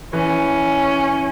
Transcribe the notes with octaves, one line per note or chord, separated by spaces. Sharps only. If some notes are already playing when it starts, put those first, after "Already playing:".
E3 C#4